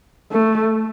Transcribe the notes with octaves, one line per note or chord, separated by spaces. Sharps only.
A3